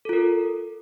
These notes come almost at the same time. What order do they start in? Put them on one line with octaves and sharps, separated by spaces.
A4 F4 A#4